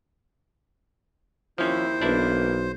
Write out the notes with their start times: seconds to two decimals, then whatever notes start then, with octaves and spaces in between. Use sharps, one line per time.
1.58 D#2 F3 C4 C#4 E4 C5
2.01 B1 E3 A#3 B3 D4 E4